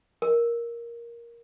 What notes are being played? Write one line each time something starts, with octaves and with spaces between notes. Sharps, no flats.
A#4